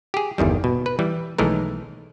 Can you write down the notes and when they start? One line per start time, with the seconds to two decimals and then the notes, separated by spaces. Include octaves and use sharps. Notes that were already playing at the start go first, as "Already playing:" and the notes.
0.14 G4 G#4
0.38 G1 E2 D#3 G3
0.64 B2
0.86 B4
0.99 E3 G3
1.38 B1 D#3 E3 G#3 A3 A#4